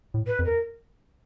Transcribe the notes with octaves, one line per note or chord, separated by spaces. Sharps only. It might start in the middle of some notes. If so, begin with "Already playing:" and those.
A2
B4
F2
A#4